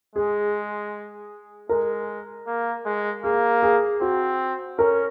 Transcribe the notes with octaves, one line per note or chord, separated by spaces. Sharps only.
G#3 G#4
G#3 A#4
A#3
G#3
A#3 G#4
G#4
C4 F#4
C#4 A#4